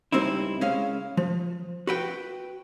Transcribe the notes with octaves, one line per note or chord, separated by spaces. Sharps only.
C#2 G3 C4 D#4 E4
G#3 C#4 F5
F3
F#4 B4 G5